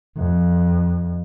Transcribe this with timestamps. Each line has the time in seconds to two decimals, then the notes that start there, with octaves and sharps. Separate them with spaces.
0.17 F2